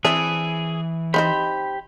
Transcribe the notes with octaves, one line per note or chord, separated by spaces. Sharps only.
E3 C4 D4 G#4 E5
C4 D#4 G4 C5 B5